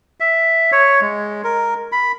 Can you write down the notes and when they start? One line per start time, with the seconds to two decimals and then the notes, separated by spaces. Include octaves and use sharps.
0.20 E5
0.72 C#5
1.01 G#3
1.44 A#4
1.92 B5